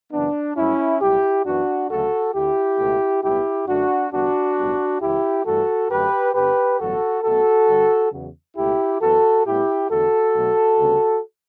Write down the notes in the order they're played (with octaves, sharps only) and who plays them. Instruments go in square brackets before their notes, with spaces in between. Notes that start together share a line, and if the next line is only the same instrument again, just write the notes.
[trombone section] F#2 C#3 E3 B3 D4
G2 F#3 A3 C#4 E4
B1 A2 G3 E4 G4
F#2 E3 B3 D4 F#4
D2 C#3 F#3 A3 F#4 A4
D2 D3 A3 E4 G4
C#2 B2 A3
B1 A2 G3 B3 E4 G4
F#2 D3 A3 D4 F#4
E2 D3 G3 B3 D4 F#4
B1 A2 G3 B3
C#2 C#3 E3 E4 G4
G2 E3 A3 F#4 A4
F#2 D3 A3 G4 B4
G2 D3 G3 B3 G4 B4
A1 G2 D3 F#3 B3 F#4 A4
B1 B2 A3 F#4 A4
G2 D3 G3
E2 C#3 F#3
C#2 B2 A3 E4 G4
F#2 E3 B3 F#4 A4
A2 G3 B3 E4 G4
E2 D3 A3 F#4 A4
B1 B2 F#3 A3
D2 C#3 G3 B3